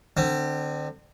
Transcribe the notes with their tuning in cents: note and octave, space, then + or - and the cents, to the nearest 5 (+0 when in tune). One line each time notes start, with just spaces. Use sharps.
D3 +30 C4 +0